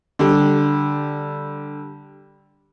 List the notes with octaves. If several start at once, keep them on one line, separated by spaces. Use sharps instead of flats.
D3 G3